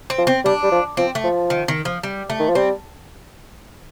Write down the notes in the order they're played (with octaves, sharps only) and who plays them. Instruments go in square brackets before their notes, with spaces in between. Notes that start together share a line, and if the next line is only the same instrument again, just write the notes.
[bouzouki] C4
[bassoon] F3
[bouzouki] C4
[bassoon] G3 [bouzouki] D4
[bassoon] G3
F3
[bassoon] F3 [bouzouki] C4
[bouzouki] A3
[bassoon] F3
[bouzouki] D#3
D#3
F3
G3
A3
[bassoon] D#3
F3
[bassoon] G3 [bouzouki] C4